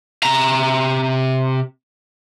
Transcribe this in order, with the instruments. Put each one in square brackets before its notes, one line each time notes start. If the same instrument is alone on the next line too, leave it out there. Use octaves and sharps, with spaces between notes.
[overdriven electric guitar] C3 A#5